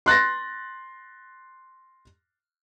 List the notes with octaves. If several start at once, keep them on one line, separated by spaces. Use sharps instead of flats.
C6 F#6 A6 A#6